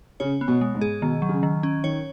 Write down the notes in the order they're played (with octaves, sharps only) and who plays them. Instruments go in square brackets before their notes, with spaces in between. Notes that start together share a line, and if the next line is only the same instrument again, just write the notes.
[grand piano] C#3 [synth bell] C#5
[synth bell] B3
[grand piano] B2
[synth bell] G#3
[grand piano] G#2
[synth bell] G#4
[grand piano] B2 [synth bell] D#3
[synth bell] F#3
[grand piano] C#3
[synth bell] D#3
C#4
[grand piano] D#3 [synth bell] C#5